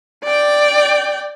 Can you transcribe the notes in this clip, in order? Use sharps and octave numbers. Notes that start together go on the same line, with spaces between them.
D5 G5